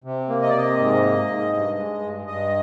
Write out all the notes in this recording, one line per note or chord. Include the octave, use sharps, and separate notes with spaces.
C3
A#3
D#5
D5
C3 D#5
G#2
A#3
G#2
G2
G#3
G2
G2 D#5